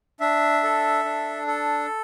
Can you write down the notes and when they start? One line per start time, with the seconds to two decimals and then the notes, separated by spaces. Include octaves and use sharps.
0.20 D4 E5
0.63 A4
1.05 D4
1.47 A4